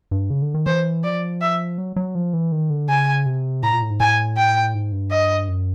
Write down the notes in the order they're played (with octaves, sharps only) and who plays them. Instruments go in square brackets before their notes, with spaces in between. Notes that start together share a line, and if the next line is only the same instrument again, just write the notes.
[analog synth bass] G2
C#3
D3
D#3
[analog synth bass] E3 [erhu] C5
[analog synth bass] F3 [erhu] D5
[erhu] E5
[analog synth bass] F#3
F#3
F3
E3
D#3
D3
[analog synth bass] C#3 [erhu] G#5
[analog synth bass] C3
[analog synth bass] A2 [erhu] A#5
[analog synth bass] A#2
A2
G#2
[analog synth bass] A2 [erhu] G#5
[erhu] G5
[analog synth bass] G#2
G2
[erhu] D#5
[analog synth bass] F#2